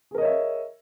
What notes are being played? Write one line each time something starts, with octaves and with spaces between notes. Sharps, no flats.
G#4 A#4 C#5 D#5 E5